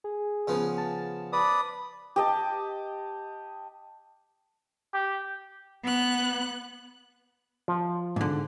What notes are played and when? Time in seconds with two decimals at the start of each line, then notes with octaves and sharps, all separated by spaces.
0.04 G#4
0.47 C#3 F3 B3
0.78 A5
1.33 B4 D5 D#6
2.16 G4 D#5 A5
4.94 G4
5.84 B3 F#6
7.68 F3
8.16 G#2 D3